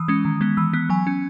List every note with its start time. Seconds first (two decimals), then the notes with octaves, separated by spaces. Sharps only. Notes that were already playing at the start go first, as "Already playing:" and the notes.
Already playing: E3 D#6
0.08 G#3 C#4
0.25 D#3
0.41 G#3 B3
0.57 E3 E6
0.73 B3 F#6
0.89 F#3 G#5
1.07 C#4